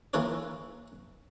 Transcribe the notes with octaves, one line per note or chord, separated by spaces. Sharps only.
E3 A#3 F4 A#4 B4 C#5